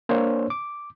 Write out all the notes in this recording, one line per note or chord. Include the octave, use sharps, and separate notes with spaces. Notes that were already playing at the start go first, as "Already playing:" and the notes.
A#3 D4 C5 C#5
D6